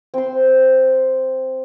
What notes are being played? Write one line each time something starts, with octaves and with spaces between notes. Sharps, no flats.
C4 C6